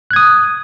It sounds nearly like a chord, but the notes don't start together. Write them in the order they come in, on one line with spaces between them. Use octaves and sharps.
F#6 G#6 D#6